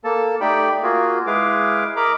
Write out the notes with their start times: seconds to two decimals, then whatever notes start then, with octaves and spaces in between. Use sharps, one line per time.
0.04 A#3 A4 A5
0.41 A3 D#4 G4 D5 G5 B5
0.83 A#3 F4 F#4 G#4
1.27 G#3 E4 G#4 B4 F5 D6
1.96 A#4 D#5 A#5 B5 D6